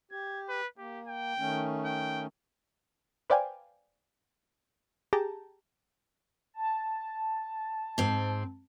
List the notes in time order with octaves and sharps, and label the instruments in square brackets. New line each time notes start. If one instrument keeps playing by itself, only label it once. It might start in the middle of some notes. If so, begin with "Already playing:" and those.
[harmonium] G4 [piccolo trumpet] G#6
[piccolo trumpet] B4
[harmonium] A#3 [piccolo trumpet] G4
[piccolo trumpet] G5
[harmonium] D#3 A3 C#4
[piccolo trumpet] G5
[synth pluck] B4 C5 D5 F5 G5 G#5
G4 G#4 G5 A5 A#5
[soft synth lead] A5
[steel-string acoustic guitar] G#2 C4